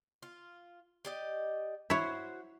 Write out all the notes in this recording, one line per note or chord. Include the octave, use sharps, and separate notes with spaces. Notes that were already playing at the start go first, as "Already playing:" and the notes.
F4
G4 D5 D#5
E4 F#4 C5 C#5